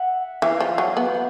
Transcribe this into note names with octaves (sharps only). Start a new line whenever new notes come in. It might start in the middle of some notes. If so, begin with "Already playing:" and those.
Already playing: E5 F#5
E3 F5 G5
F3
F#3
B3
G5
E5 F#5